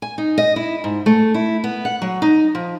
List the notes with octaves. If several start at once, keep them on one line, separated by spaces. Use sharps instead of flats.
G#5
D#4
D#5
E4
G#2
A3
E4
B3
F#5
F#3
D#4
F3